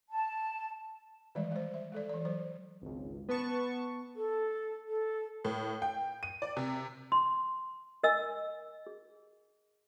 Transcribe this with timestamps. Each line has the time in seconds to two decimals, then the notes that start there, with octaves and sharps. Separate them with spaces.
0.09 A5
1.35 D#3 E3 G3 G#3 D5
1.52 G#3 C5
1.74 E5
1.92 G#3 A4 D5
2.09 E3 D5
2.25 F#3 C5
2.82 G#1 C#2
3.29 B3 B4 A5 C#6
4.16 A4
4.89 A4
5.45 A2
5.82 G5
6.23 D#7
6.42 D5
6.57 C3
7.12 C6
8.04 A#4 D#5 G#5 E6
8.87 G#4